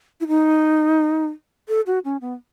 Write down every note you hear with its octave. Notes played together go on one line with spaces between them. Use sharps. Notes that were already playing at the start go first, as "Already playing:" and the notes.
E4
D#4
A4
F#4
C#4
B3